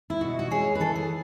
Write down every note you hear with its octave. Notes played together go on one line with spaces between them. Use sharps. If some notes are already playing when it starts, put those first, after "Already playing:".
E4
B2 F#4
F#4
G#3 C#4 G#4
B4
E3 A4
G#4